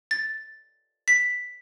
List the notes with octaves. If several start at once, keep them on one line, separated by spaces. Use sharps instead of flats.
A6
B6